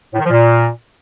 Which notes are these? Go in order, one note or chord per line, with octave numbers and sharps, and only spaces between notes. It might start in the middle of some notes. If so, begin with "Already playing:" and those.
A2
D#3
F3
A#2